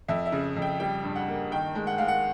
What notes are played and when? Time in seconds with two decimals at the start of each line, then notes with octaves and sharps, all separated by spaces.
0.08 F2 E5
0.26 E5
0.32 C#3
0.56 F2
0.62 G5
0.80 G3 G5
1.04 G2
1.15 F#5
1.28 A#3
1.52 D#3 G5
1.75 G#3
1.87 F#5
1.98 G#3 F5
2.08 F#5